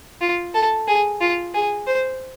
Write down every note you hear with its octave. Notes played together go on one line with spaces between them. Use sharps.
F4
A4
G#4
F4
G#4
C5